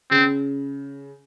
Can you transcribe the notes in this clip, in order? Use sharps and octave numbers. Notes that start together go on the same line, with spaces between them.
C#3 C4